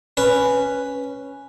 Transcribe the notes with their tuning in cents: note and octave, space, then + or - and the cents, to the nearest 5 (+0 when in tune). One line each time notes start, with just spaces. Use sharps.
C#4 +0 B4 +0